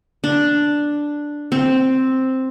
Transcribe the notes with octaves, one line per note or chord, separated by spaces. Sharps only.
D4
C4